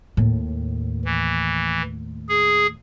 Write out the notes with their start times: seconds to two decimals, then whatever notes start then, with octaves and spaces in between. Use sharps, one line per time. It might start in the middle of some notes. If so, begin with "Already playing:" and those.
0.17 D#2 A2
1.05 E3
2.29 G#4